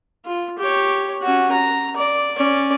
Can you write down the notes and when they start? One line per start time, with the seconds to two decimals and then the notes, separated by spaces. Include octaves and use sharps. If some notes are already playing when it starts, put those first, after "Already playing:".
0.25 F4
0.58 G4 C#5
1.22 C#4 F#4
1.52 A#5
1.96 D5
2.36 C#4 D5